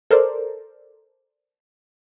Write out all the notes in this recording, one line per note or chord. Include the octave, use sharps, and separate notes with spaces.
A4 A#4 C5 D5